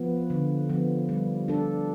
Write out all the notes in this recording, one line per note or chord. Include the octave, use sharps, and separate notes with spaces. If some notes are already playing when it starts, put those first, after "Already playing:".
Already playing: F3 B3
D3
F3 B3
G3
D4 A4